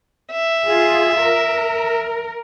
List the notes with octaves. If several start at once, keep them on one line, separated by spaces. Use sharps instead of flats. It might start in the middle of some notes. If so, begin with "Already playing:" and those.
E5
F4 G#4
A#4